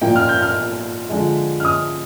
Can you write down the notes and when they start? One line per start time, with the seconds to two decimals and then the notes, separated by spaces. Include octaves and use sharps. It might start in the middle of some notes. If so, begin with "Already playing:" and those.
0.02 A#2 F3 A#3 G5
0.16 F6
0.29 G6
0.42 F6
1.10 D3 F3 G#3
1.60 F6
1.65 D#6